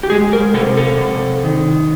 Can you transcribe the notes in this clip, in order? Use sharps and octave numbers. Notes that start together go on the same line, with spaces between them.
G4
G#3 G#4
A#4
C3 A4
A4
C3
D#3